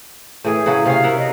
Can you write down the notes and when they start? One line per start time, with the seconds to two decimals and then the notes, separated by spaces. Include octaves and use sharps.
0.45 A2 E3 G#4
0.66 C#3 F#3 F#4
0.86 C3 C#4 F5
1.04 A#4 E5 F#5
1.18 D#5